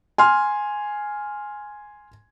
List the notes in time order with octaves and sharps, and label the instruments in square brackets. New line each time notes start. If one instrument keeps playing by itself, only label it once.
[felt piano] G#5 C6 F6